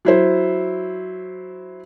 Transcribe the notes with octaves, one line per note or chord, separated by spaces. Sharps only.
F#3 E4 C5